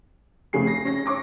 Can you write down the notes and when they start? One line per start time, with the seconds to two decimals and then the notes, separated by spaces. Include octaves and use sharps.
0.53 F2 C#3 A3 G#4 C7
0.67 A#6
0.85 C#4 A#6
1.06 C#5 C#6 D6 A#6